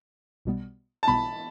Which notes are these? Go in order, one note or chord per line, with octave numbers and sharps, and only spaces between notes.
B1 B2 G3 B3
A5
B1 B2 G3 B3 B5